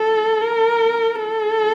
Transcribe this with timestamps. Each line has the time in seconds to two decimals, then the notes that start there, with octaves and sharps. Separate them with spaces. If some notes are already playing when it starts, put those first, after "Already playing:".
Already playing: A4
0.41 A#4
1.15 A4